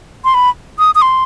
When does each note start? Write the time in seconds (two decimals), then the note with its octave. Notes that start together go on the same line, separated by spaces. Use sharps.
0.24 C6
0.34 B5
0.79 D#6
0.95 D#6
1.02 C6